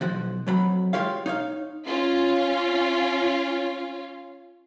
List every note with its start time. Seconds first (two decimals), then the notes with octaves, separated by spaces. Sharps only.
0.01 B1 F3 F#4
0.47 F2 F#3 B5
0.93 G#3 A3 F4 G4 C#5 F5
1.26 D#4 C#5 F5
1.87 C#4 F4 F5